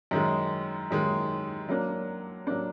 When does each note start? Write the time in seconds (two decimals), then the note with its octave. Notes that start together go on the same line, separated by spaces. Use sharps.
0.11 F#2 D#3 G#3
0.90 F#2 D#3 G#3
1.69 F#3 A#3 D4
2.47 F#3 A#3 D4